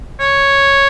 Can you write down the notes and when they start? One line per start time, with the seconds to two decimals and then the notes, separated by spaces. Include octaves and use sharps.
0.20 C#5